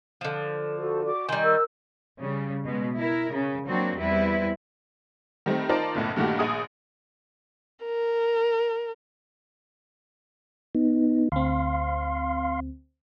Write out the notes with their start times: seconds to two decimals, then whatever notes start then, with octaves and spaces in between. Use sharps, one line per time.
0.21 D3 F3
0.78 F#4 A4 C5
1.04 F#4 D5 D6
1.29 D#3 G3 G#5 C6
1.42 A#4 E6
2.20 C#3 G3
2.65 B2 G#3
2.96 E4 A#4
3.31 C#3
3.68 F#3 A#3 C4 D4 F#4
3.98 E2 G3 C4 E4 B4
5.46 D#3 G3 A3 C4
5.69 D#4 F4 A#4 C5 D5 A5
5.95 F#1 B1 A2
6.16 G2 A#2 D#3 A3 F#4 G4
6.39 A#1 G#4 G#5 D#6
7.85 A#4
10.75 B3 D#4
11.32 D2 C4 F5 C6